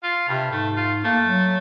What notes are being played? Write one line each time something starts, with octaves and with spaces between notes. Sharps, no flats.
F4
G2 C3
G#2 A3
F4
A3 A#3
F#3